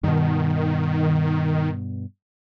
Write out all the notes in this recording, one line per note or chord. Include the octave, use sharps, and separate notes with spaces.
G2 B2 D#3